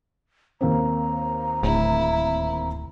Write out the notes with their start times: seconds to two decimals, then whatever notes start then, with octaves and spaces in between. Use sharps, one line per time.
0.61 D#2 A#3 C4 A#5
1.63 D1 E4